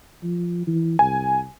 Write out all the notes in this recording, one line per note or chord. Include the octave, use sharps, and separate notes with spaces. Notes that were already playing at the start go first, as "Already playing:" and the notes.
F3
E3
C2 G#5